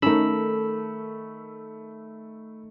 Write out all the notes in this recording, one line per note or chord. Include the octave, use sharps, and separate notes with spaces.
D#3 A3 C#4 D#4 A4 A#4 B5 E6